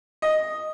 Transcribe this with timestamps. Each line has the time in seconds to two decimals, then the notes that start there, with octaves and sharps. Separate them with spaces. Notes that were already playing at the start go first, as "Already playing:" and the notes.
0.22 D#5